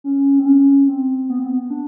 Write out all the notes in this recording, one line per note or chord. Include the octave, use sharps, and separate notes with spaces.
C#4
C4
C#4
C4
B3
C4
B3
D4